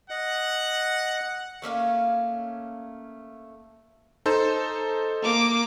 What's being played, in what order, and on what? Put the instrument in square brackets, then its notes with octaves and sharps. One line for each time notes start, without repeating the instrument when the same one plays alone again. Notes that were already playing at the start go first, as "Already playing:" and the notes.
[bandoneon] D#5 [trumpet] F#5
[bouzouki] A3 A#3 C#4 F5
[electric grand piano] D#4 A4 C5
[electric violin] A#3 D6